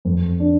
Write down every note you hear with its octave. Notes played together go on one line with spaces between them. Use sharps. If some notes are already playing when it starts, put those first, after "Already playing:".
F2
D4